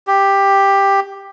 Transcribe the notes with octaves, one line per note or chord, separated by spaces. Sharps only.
G4